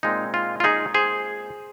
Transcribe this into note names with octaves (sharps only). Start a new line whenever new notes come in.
A#2 G#3 C4 D#4
F4
F4
D#4 G#4
G#4 C5